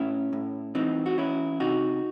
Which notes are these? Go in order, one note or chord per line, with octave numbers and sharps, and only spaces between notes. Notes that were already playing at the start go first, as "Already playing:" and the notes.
Already playing: A2 C#4 E4
A2
E3 C4 D#4
F#4
E3 C#4 E4
C3 D#4 F#4